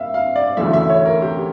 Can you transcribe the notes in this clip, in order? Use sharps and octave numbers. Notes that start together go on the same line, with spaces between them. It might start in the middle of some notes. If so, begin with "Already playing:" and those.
Already playing: G3 A#3 E5 F5
F5
D5
D2 C#3 E3 A3 E5
E5
C#5
A#4
G4